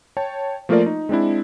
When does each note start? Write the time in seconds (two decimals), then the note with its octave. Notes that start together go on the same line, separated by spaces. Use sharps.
0.17 C#5 G5 A5
0.69 F3 A3 A#3 F4 A#4 D5
0.86 D#4
1.09 G#3 C4 D4 E4